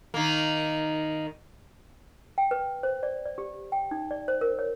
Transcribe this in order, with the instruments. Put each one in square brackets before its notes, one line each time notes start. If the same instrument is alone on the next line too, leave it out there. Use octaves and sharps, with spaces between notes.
[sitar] D#3 A#3
[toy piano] G5
B4
C5
D5
D5
G4
G5
D#4
D5
C5
A#4
C#5